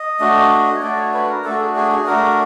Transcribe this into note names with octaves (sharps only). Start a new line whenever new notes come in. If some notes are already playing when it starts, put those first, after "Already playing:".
Already playing: D#5
A3 D4 F#4
C#5
A3 D4 F#4 D5
C#5
B4
A#4
A3 D4 F#4 A4
G#4
G#4
G#4
A3 D4 F#4 A#4